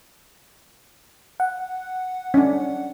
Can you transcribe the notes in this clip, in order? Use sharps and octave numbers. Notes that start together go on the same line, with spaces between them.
F#5
C#4 D4